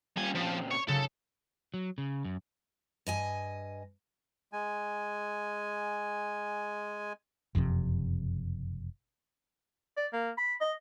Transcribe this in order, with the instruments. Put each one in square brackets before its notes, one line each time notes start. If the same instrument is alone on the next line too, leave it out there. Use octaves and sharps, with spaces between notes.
[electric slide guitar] G3 A#3 F4 [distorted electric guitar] C#4 G#5
[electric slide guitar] A#2 C4 C#4 [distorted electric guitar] F3
[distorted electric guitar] C#5
[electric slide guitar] F#2 [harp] C#3 [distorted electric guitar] A4
[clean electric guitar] F#3
C#3
F#2
[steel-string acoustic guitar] G2 D#5 G#5
[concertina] G#3 G#5
[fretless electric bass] F#1 F2 A2 C3
[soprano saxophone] D5
A#3
B5
D#5